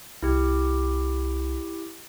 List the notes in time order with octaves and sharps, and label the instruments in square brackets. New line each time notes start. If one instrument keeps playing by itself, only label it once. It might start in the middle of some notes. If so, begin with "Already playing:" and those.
[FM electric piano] C2 [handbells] E4 G4